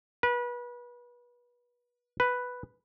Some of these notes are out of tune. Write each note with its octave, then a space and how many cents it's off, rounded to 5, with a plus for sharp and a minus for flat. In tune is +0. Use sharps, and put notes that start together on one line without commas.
B4 -30
B4 +0